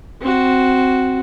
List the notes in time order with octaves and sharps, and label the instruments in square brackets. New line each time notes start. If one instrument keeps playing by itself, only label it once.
[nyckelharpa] C4 F#4